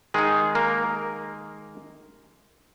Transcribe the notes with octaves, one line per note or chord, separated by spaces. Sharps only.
D#3 G#3 D#4 G#4
A#3 A#4